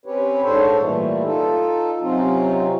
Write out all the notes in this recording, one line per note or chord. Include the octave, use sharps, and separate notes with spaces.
C4 C#4 G4 B4 C#5
G#2 D4 A4 C5 C#5
A#2 E3 G3 A3
D#4 F4 A4
C3 F#3 C4 C#4 D#4 F4